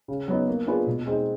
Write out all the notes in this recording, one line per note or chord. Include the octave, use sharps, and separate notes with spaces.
C#3
F#3 B3 D#4
A#3
D4 F4 G#4 B4
B2
G#3 C4 D#4